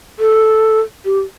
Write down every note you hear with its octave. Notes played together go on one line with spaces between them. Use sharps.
A4
G4